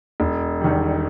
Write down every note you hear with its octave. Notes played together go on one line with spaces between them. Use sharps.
E1
E2 D#3 G3